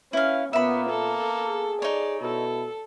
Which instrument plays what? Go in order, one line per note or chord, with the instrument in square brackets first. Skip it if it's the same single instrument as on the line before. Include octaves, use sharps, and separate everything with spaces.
[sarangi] C#4 [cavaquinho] E4 F5 [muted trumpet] B4
[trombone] A#2 [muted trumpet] A#3 [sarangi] B3 [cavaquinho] E5 B5
[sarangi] A4
[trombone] G#4
[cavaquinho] D#4 C#5 [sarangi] D5
[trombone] B2 [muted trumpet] E4 [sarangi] A4